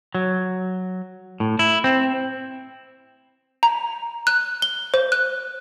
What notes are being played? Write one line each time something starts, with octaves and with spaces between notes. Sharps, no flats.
F#3
A2
E4
C4
A#5
F#6
G7
C5
F#6